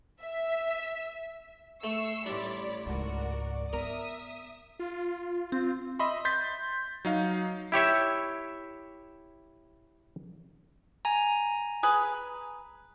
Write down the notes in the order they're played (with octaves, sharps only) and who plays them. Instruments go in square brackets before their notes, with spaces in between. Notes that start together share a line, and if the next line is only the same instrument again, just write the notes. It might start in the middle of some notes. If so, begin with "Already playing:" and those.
[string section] E5
[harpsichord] A3 [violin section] C#6 E6 C7
[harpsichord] A1 D4 [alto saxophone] G3 [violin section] C#5 D5 B5
[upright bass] C#2 G#2 [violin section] F#4 A#4 [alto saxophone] D5
[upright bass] B3 [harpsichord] A#4 A#5 [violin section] E5 D#6
[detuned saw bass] F4
[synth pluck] C4
[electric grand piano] D#5 E5 B5 C6
C6 G6 A6 B6
F#3 D#4 F5
[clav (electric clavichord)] E4 G4 C#5 E5
[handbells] G#5 A#5
[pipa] G#4 B4